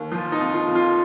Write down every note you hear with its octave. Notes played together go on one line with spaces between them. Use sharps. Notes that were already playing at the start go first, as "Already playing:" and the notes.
Already playing: D#2
F3 F4
D#4
F2
F4
F2
F4